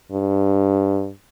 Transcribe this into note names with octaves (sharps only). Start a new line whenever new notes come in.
G2